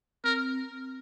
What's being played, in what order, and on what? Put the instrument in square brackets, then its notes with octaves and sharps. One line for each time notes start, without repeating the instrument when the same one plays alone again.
[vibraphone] C4 [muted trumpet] A#4